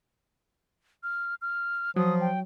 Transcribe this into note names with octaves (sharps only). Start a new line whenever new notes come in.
F6
F6
F3 F#3 D#6
G5